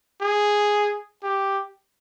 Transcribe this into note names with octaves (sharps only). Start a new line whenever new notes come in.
G#4
G4